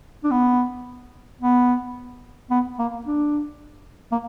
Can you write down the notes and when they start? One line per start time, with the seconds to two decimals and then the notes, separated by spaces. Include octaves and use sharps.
0.24 D4
0.31 B3
1.41 B3
2.50 B3
2.79 A#3
3.06 D4
4.12 A#3